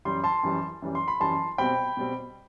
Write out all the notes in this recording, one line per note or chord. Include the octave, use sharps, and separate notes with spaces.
F#2 E3 G3 C6
A5 C6
F#2 E3 G3
F#2 E3 G3
C6
B5
F#2 E3 G3 A5 C6
B2 G3 C4 G5 B5
B2 G3 C4